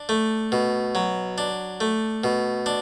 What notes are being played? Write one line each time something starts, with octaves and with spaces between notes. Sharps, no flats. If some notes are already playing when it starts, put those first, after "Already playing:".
Already playing: D4
A3
B2
F#3
D4
A3
B2
D4